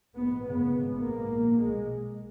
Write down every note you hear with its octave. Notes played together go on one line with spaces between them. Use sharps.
A#1 G#2 B3
G#1 F#2 C#3 B3
G#1 G#2
A#1 G#2 A#3
A#1 A#2
B1 B2 G#3